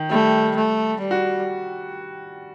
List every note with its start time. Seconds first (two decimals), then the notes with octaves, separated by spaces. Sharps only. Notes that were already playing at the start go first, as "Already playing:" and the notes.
Already playing: D#3
0.11 G3 A3
0.56 A3
1.01 G3
1.11 F#4